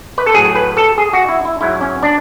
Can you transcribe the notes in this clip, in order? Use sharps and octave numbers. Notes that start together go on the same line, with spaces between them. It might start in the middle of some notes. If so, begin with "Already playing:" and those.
B4
A4
A2 F#3 G#4
B4
A4
G#4
F#4
E4
E4
G#2 F#3 E4
C#4
D4